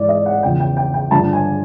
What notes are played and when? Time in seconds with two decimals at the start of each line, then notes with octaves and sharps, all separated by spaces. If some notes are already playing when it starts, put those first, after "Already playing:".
Already playing: G#2 E3 D5
0.09 D#5
0.26 F#5
0.43 E2 C#3 F3 G5
0.60 G5
0.77 G5
0.94 G5
1.11 G2 D3 F3 A5
1.33 G#5